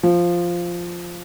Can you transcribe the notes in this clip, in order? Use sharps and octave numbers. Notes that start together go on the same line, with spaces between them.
F3